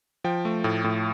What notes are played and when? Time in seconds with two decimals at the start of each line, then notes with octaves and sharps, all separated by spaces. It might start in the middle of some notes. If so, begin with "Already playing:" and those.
0.24 F3 G5
0.45 A3
0.64 A2
0.84 A2